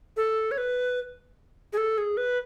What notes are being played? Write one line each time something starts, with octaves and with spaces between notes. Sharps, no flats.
A4
C#5
B4
G#4
A4
G#4
B4